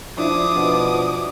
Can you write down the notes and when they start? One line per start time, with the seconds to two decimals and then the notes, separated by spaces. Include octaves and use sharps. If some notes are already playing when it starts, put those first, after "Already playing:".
0.18 F3 D4 E4 D6 D#6
0.56 B2